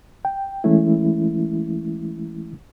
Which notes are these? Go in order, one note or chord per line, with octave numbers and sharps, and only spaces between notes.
G5
E3 G#3 A3 C#4 E4